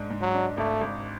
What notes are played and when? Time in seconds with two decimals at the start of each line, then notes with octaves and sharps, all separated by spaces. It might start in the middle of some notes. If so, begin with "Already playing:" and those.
Already playing: G#2 G#3 D4
0.10 G#2
0.22 F#3
0.34 D4
0.57 G#1 A3
0.81 G#1